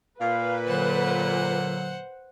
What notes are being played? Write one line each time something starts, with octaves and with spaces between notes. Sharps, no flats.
A#2 B4 F5
D3 F#3 C5 F#5